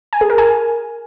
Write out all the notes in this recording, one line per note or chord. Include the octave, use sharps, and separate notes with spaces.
G#5
G#4
A#4
G#5